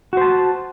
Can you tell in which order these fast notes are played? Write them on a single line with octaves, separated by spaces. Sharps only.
F#4 C5 A5